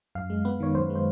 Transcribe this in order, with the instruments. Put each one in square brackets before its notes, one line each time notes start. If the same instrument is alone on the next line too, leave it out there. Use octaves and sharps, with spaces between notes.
[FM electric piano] F#2 F5
G#3
B3 B4
D#3 C#5
F#2 C5
G#3 B4
C5